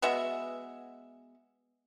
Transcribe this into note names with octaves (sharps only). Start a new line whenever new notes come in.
G#3 B3 F#4 E5